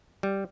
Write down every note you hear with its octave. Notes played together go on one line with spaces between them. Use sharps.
G3